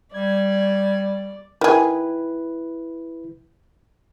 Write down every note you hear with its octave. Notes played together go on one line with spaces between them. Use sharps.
G3 D5 G#6
D#3 E4 G#4 B4